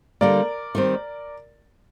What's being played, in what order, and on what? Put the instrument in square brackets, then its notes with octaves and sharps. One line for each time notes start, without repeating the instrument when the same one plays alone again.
[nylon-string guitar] D3 G3 A#3 [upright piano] A#4 D5
[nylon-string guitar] D#3 G3 C4